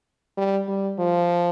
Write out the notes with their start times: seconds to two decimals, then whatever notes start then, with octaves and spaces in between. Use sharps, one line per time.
0.37 G3
0.68 G3
0.98 F3